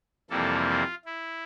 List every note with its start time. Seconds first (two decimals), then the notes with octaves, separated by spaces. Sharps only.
0.30 F2 C3 E3 G3 A#3 A4
0.68 F4
1.05 E4